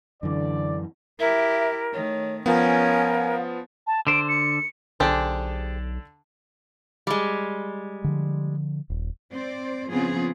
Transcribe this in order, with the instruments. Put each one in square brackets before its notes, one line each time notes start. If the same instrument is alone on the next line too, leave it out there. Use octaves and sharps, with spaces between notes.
[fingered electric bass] F#2 E3 [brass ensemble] D3 D5
[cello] E4 G4 [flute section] A#4 [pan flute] E5
[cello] D#3 A3 [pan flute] C#5
[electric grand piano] F3 B3 [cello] C#4 [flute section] A#4 G#5 [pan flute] F5
[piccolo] A5
[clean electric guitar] D3 C5 [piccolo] D7
[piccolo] C#7
[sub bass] B1 [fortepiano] D3 D4 [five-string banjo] G4 G#4 C5
[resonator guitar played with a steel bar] G3 G#3
[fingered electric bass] D3 F3
D#1
[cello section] C4 C5 D5
C#3 F3 B3 C4 F4 G#4